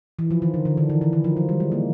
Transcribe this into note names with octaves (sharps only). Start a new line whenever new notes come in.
E3
F3
D#3
D3
D3
D#3
E3
E3
D#3
F3
F#3
G3
G#3
A#3